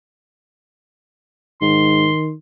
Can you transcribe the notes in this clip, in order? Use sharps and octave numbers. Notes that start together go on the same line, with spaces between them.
G#2 D#3 C6